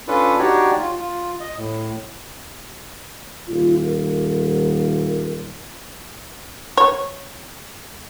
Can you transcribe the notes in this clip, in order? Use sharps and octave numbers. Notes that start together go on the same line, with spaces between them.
C#4 D4 F4 A4 B4
D4 D#4 F#4 G4 C#5 D5
F4
F4
D#5
A2
D#1 F4
A#4
C#5